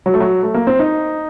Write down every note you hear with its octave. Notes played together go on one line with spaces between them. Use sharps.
F#3
A3
F#3
A3
A#3
C4
D#4